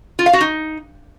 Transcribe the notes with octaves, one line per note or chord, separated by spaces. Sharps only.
F4
F5
F#4
D#4